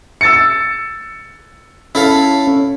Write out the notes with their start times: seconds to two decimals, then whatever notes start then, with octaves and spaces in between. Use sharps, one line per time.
0.21 E6 A6 C#7
1.95 C#4 E4 A4 F5